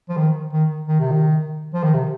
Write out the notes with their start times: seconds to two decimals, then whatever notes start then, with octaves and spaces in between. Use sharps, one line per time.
0.09 F3
0.17 D#3
0.53 D#3
0.87 D#3
1.00 C3
1.12 D#3
1.74 F3
1.83 D#3
1.93 C3